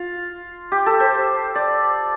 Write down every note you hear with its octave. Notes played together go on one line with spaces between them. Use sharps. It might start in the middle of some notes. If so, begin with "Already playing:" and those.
Already playing: F4
G4
A4
C5
D5